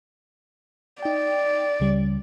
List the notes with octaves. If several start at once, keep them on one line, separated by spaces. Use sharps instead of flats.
D#4 D5 G5
C#2 C#3 G3